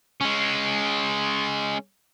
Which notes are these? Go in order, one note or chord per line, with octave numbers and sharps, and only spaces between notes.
G#3 C#4